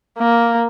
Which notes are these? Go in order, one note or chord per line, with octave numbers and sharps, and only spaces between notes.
A#3